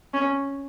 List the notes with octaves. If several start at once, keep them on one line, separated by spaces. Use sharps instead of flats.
C#4